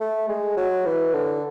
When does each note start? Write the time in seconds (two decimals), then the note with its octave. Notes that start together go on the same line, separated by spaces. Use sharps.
0.01 A3
0.28 G#3
0.57 F#3
0.85 E3
1.14 D3